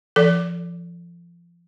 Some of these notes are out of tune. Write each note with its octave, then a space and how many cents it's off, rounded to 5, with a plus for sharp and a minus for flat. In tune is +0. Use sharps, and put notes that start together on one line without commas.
F3 -25 A4 +0 D5 -40